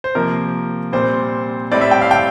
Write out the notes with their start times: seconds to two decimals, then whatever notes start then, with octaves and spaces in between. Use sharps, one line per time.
0.04 C5
0.15 C3 F3 A#3 A#4
0.93 A#2 G3 C4 C5
1.72 A2 G3 C4 D5
1.81 E5
1.91 G5
2.01 F5
2.11 G5